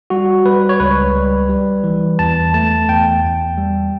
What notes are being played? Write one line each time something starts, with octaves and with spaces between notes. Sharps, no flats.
G3 F#4
G3 B4
C#5
C#2 B4
G3
G3
E3
E2 A5
A3 A5
E2 G5
E2
G3